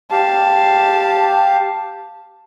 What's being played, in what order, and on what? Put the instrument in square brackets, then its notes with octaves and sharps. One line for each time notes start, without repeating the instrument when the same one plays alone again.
[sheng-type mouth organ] G4 F5 [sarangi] A5